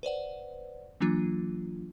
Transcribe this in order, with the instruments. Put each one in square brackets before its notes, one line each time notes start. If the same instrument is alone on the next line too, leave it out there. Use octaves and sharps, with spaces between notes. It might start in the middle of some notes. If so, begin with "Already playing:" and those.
[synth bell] B4 C5 D5 F#5
E3 F#3 A#3 D4 F4